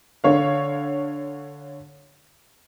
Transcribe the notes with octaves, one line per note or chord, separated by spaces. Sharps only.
D3 C#5 F5